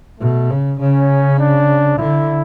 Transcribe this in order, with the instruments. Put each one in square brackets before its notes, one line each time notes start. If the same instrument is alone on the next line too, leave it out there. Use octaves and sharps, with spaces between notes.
[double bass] B2 [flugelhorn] A3
[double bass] C#3
[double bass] C#3 [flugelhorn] C#4
[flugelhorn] D4
[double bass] D3 [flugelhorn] E4